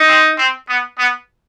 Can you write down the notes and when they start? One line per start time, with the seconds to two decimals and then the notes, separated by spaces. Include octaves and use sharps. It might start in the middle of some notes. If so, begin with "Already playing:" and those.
Already playing: D#4
0.08 C4
0.38 C4
0.69 B3
0.99 B3